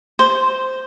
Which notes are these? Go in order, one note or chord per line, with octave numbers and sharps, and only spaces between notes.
C5